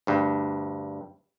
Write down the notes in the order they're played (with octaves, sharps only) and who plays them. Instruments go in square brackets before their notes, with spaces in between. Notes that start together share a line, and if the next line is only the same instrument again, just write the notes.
[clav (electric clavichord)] D2 G2